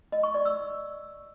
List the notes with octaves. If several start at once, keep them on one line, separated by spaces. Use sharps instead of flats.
D#5
C#6
D5
E6